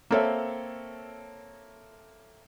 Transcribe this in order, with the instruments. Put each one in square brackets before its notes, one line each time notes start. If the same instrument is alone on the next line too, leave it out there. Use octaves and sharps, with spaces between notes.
[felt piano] A#3 C4 A4 C#5 E5